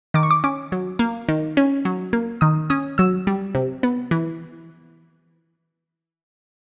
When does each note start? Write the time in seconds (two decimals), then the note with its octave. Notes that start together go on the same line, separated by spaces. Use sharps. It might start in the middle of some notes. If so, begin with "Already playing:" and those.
0.14 D#3 D6
0.23 C#6
0.31 D6
0.44 C#4 D6
0.72 F#3
0.99 A#3
1.29 D#3
1.57 C#4
1.85 F#3
2.13 A#3
2.41 D#3 D#6
2.70 C#4 D#6
2.98 F#3 E6
3.27 G3
3.55 C3
3.83 B3
4.11 E3